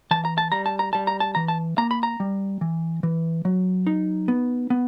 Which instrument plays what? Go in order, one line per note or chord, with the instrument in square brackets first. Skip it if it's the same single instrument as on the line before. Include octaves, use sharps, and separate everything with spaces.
[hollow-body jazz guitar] E3 A5
A#5
A5
G3 A#5
A5
A#5
G3 A5
A#5
A5
E3 A#5
A5
A#3 A#5
B5
A#5
G3
E3
E3
F#3
D#4
B3
B3